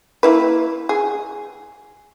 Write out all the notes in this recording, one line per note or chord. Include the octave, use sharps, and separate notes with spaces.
A#3 E4 B4
G#4